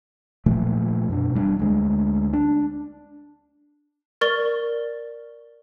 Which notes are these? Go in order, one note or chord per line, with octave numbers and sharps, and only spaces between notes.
A#2 D#3 F3 A3
F#2 B2 D4
E1 G3 C4 D4
D2 G#3
D4
A#4 D5 C#6 A6 G7